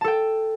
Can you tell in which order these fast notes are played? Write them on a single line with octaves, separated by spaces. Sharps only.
A5 A4 G5